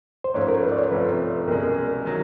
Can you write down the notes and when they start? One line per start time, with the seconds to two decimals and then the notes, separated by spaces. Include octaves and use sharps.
0.24 C5
0.34 G#2 F3 A3 C#4 C#5
0.48 A#4
0.63 B4
0.72 D5
0.77 C#5
0.91 C2 C3 F3 A3 C4 B4
1.47 C2 B2 G#3 C#4 A#4
2.05 D#3 F#3